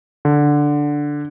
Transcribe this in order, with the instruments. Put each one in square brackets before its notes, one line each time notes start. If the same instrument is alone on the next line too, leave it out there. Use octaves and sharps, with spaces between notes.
[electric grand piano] D3